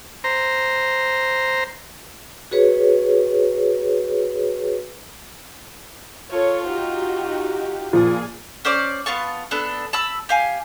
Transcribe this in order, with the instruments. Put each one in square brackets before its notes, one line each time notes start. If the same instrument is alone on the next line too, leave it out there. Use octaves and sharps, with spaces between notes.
[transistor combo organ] C5 A#5
[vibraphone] F#4 G#4 B4 C#5
[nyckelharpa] F4 [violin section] A4 C#5
[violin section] D#4 F#4 G4
[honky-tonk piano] A#2 F3 [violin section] G#4
[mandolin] C#4 C5 D5 D6
B3 F4 A5 C#6
B3 D4 A4
A5 B5 E6
G4 F5 G#5